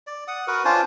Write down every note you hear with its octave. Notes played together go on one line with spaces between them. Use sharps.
D5
F#5 D#6
F#4 A#4 B4
C#4 D4 F4 C5